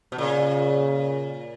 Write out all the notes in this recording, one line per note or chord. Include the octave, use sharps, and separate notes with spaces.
B2
A#2 C#3